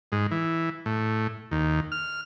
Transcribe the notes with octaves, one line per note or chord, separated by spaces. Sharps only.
G#2
E3
A2
D#2
F6